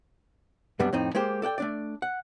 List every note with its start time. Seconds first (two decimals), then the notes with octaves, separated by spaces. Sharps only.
0.79 F#2 C3 G3 B3 D4
0.93 F2 A2 C4 D#4
1.15 G#3 A#3 G4 C5
1.42 A4 D5 F#5 G5
1.58 A3 D4 D5
2.02 F#5